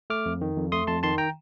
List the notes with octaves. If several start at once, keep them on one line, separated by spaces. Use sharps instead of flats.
A3 D6 F6
F2
D#3
F2
A3 C6 D#6
F2 A5 C6
D#3 A5 C6
G5 A#5